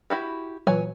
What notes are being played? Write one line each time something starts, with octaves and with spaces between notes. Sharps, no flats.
E4 F#4 G4
A#2 E3 F#3 C#5 G#5